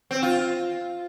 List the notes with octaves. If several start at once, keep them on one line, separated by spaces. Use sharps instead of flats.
C4
F4